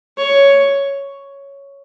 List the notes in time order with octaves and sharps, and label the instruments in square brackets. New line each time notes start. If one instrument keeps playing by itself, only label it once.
[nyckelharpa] C#5